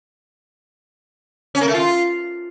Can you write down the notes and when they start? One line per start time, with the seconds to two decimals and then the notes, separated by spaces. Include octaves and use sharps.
1.55 C#4
1.61 A#3
1.68 A3
1.74 F4